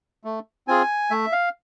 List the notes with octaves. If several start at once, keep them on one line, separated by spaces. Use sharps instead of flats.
A3
C4 F4 G#4 G#5
A3 E5
F5